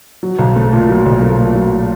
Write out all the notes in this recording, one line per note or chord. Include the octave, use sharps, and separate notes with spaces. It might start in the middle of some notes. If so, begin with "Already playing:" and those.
F#3
B1
A3
A#2
F#3
B1
A3
A#2
F#3